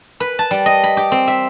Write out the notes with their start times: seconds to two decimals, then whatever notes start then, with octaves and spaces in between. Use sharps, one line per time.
0.20 B4
0.39 A5
0.51 G3
0.66 D#5
0.84 B5
0.97 G4
1.12 C4
1.27 E5